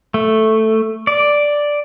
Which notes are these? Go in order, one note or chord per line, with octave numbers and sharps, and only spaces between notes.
A3
D5